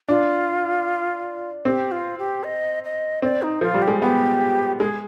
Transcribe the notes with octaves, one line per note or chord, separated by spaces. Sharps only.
D4 F4
C4 G4
F4
G4
D#5
D#5
C4 D5
D#4
F3 F4
G3
G4
G#3
B3 G4
G#3 G#4